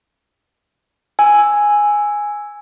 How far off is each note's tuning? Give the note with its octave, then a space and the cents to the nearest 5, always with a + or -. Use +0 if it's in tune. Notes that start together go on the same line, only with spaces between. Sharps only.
G#5 +0 E6 +0